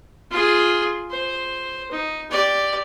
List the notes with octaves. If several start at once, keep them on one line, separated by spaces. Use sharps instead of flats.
F4 G#4
C5
D#4
G4 D5